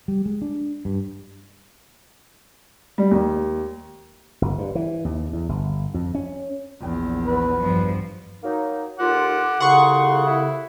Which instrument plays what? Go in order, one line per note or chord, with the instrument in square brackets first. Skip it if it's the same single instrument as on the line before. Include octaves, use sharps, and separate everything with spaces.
[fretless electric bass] G3
G#3
D4
G2
[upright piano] G3
D#2
[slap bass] G1
G2
E3
D#2
E2
G1
F2
C#4
[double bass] A#1 E2
[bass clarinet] B4
[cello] G2 F3
[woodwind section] F#3 A#3 D#4
[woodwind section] D#2 F4 [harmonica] F#5 D6
[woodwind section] C2 F2 C#3 [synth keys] F#5 C#6 [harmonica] C6
[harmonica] E4